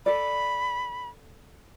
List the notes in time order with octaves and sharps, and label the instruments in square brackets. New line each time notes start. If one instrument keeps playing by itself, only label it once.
[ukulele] A4 D5 [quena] B5